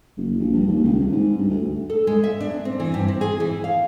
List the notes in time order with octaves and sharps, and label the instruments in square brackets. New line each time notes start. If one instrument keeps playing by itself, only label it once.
[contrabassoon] F#1
A#1
G2
D#2
C#2
C2
G#2
G2
D2
[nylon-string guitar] A4
G#3
E5
D4
C4
E3
G2
C4
G#4
E3
F5